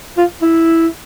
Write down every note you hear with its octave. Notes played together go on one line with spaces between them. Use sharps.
F4
E4